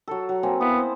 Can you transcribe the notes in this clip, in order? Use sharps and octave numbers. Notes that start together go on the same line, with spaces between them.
F#3 A4
F#3
A#3 C4 G#5
B3 E4
C5